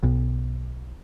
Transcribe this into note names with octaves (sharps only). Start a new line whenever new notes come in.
B1 B2